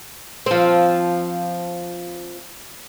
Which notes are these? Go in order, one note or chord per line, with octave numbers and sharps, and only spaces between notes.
F3 C4